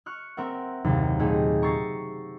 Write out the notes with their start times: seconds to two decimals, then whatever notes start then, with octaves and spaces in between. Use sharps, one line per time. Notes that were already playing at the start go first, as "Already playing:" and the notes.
0.06 C#6 F6 F#6
0.37 C4 A#4 E5 F#5
0.84 F#1 D#2 C3
1.19 A#2 A3 A#3 D#4 G4 G#4
1.62 A#5 C#6 E6 A6 C7